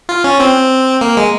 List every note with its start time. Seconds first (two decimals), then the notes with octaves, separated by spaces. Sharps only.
0.09 F4
0.24 C#4
0.40 C4
1.01 A#3
1.17 G#3